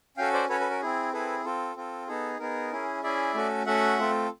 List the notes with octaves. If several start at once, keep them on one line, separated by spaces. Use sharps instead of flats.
C#4 F#4 A4 F5 G5
C5 D5
C#4 F#4 A4 B4 C#5
A4 B4
A#4
C4 E4 G#4
C4 E4 G#4 A4 B4
C4 F4 A4
C4 F4 A4
B3 D#4 G#4 A4
B3 D#4 G#4 A#4
C#4 E4 G#4
C#4 E4 G#4 D5 E5
A3 C#4 F#4 A4
A3 C#4 F#4 A4 E5 F#5
A3 C4 F4 A4